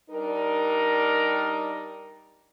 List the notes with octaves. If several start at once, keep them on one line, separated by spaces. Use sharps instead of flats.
G3 D4 D#4 A#4